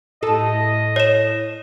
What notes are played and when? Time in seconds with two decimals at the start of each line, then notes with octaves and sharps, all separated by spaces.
0.23 A2 A4 D#5
0.96 C#5 E7